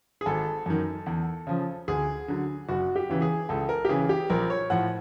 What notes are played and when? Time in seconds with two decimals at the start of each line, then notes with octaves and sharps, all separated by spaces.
0.21 G#4
0.26 G#1 A4
0.66 F#2 D#3
1.06 E2
1.47 C#3 F3
1.88 D2 G#4
2.28 D3 F#3
2.69 F#1 F#4
2.96 G4
3.09 E2 C#3 E3
3.22 G#4
3.49 C#2 A4
3.69 A#4
3.85 G4
3.89 C#3 E3 G#4
4.09 G4
4.30 A#1 A#4
4.50 C#5
4.70 A2 F3 F#5